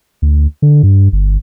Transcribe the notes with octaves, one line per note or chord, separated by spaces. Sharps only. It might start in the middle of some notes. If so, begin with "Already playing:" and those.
D2
D3
G2
G1